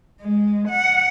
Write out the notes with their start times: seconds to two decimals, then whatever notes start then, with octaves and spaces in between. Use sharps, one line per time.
0.21 G#3
0.68 F#5